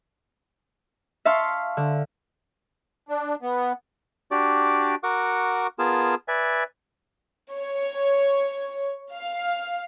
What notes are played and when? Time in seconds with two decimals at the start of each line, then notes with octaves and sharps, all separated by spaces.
1.25 E5 F5 A5 C6 C#6 F6
1.77 D3
3.09 D4
3.42 B3
4.31 D4 F#4 G4 D5 D6
5.03 F#4 A#4 F#5 C#6 D6
5.79 B3 F4 G#4 A#4 A5
6.28 B4 D5 E5 G#5
7.52 C#5
9.13 F5